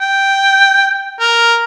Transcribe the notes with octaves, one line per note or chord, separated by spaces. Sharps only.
G5
A#4